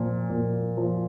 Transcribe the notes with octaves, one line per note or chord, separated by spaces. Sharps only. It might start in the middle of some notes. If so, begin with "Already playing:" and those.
Already playing: A#2 F3
A#2
F3